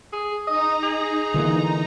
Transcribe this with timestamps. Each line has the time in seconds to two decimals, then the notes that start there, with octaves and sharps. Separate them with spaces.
0.13 G#4
0.47 D#4 D#5 A#5
0.83 G#4
1.34 D3 E3 A#3